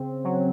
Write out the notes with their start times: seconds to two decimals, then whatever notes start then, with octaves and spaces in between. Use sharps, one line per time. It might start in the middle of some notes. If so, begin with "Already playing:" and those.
Already playing: C#3 C4
0.24 F#3